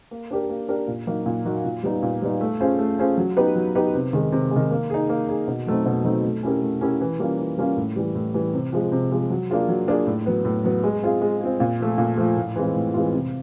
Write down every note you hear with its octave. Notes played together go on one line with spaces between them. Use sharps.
A#3
D4 G4 A#4
A#3
D4 G4 A#4
A#2
F#3 A#3 D#4 F#4
A#2
F#3 A#3 D#4 F#4
A#2
G3 B3 D#4
A#2
G3 B3 D#4
A3
C#4 F4 G#4 C5
A3
C#4 F4 G#4 C5
F#3
B3 D#4 G4 B4
F#3
B3 D#4 G4 B4
C3
D#3 G#3
C3
G#3
D#3
A#3
D#4 G#4
A#3
D#4 G#4
B2
F#3 A3 C4 D#4
B2
F#3 A3 C4 D#4
A3
C#4 E4 G4 A#4
A3
C#4 E4 G4 A#4
E3
G3 A#3 C#4 F4
E3
G3 A#3 C#4 F4
A2
E3 G3
A2
E3 G3
C3
F3 G#3
C3
F3 G#3
F#3
A#3 D4 F4 G#4
F#3
A#3 D4 F4 G#4
A2
F#3 B3
A2
F#3 B3
G#3
C4 F4 G#4
G#3
C4 F4 G#4
A#2
F3 A3
A#2
F3 A3
A2
E3 G#3 C4 F4
A2
E3 G#3 C4 F4
C3